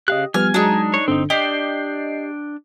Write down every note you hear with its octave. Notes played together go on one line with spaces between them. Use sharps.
C#3 G4 D#5 F5 F#6
F3 G3 B3 G#5 F6
F#3 G#3 D4 D#4
C#5
G1 D3 C4 D#4
D4 G4 D5 D#5 G5 C7